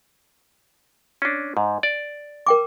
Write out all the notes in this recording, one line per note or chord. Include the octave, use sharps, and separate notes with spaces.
C#4 D4
G#2
D5
A#4 G5 D6